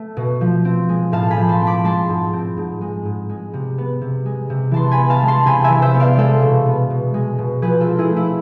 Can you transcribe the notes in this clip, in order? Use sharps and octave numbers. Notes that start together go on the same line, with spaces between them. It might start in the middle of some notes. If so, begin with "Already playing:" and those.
Already playing: A3
B2
F3
C4
G#3
A2 F5 A5
G#5 B5
F3
A5 C6
C4
B5 D6
G#3 A5 C6
G#2
C4
G#2
G#3
G#2
G#3
C3
B3
C3
G#3
C3
E3 A5 C6
G#5 B5
B3
F5 A5
G#3
A5 C6
C3 G#5 B5
E5 G#5
E3
C5 E5
B3
D5 F5
G#3 A4 C5
B2
B3
B2
G#3
B2
F3 G#4 B4
F4 A4
C4
E4 G#4
A3
E4